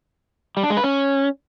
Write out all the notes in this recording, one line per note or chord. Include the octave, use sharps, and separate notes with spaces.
G3
D4
G#3
B4
C#4